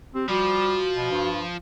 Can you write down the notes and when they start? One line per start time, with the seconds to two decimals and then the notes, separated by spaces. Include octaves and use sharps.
0.14 C4 G4
0.29 F3 G3 F#4
0.96 B2
1.11 G2